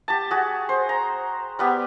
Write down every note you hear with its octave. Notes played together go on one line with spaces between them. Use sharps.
G4 A5
F#4 G#4
C5
A#5
G3 B3 G4